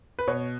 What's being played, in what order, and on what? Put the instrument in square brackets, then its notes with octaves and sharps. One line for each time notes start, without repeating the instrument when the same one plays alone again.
[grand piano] B4
B2 C#5